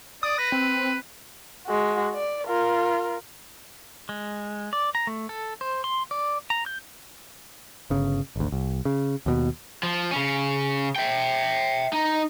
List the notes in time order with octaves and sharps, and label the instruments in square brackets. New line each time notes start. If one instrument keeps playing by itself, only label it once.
[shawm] D5 [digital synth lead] D#6
[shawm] B4 [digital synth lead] A#6
[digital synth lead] C4
[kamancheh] G#3 F#4
D5
F4 A#4
[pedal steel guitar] G#3
D5
A#5
A3
A4
C5
C6
D5
A#5
G6
[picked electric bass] G1 C#3
G#1 D2
C2
C#3
D#2 B2
[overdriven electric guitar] F3
C#3 C#4
E5 G5
D#4